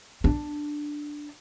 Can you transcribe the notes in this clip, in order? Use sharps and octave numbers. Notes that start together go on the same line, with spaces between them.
D4